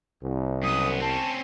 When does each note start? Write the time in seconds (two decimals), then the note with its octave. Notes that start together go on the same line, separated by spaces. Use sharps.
0.23 C2
0.63 F#2 B3 D#6
1.01 C4 C#4 A5